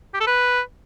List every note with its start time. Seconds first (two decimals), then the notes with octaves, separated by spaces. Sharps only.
0.14 G4
0.20 A4
0.27 B4